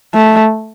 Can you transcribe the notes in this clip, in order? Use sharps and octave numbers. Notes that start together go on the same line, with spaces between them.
A3